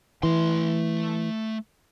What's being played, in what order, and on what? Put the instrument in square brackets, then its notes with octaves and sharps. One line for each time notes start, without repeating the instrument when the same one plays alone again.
[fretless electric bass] E3 [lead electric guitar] A3 C6